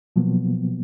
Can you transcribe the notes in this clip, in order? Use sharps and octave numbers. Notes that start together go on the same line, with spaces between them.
B2 F3 F#3 A#3 B3